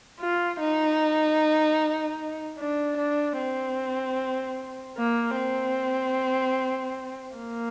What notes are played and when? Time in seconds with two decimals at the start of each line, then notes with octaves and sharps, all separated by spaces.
0.20 F4
0.60 D#4
2.58 D4
2.98 D4
3.38 C4
4.97 A#3
5.37 C4
7.35 A#3